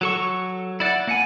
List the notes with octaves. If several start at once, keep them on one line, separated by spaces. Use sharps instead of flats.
F#3 A4 C#6
E4 D5 F#5
A#3 F#5 G#5